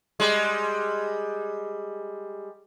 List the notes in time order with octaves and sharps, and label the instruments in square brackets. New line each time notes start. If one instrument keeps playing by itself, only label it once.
[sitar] G3 G#3